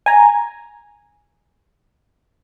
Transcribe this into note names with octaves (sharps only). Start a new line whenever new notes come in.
G#5 A#5